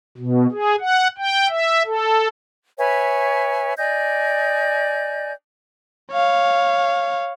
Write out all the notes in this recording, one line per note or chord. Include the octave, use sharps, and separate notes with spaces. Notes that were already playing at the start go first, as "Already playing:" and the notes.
B2
G#4
F#5
G5
E5
A4
B4 C#5 E5 G#5
D5 D#5 G#5 G6
C#5 F5